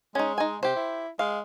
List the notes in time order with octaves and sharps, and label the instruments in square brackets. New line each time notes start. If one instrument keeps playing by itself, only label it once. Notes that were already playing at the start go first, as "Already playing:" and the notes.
[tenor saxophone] G#3 [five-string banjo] C#4 D#4
[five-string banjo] D#4 G#5
[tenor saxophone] C3 [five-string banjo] G4 C5
[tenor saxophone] E4
[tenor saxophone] G#3 [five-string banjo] F5